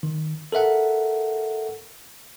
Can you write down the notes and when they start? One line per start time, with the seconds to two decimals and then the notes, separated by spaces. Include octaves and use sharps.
0.03 D#3
0.52 A4 A#4 E5 F#5